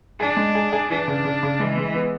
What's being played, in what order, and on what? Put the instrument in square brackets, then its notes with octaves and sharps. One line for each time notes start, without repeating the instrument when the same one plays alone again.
[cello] D4 [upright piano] G#4
[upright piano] G#3
G#4
G#4
[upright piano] E3 [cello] D4
[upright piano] C#3
C#3
C#3
[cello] E3 [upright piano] G#3
[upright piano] G#3
B3